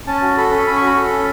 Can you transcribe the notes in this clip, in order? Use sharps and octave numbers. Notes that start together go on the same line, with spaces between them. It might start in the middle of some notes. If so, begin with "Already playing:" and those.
C#4 A5
F#4
A4 B5
C#4
C#4 B5
F#4 C#6
B5
A4
C#4